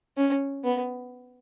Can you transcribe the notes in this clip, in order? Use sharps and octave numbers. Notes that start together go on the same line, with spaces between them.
C#4
B3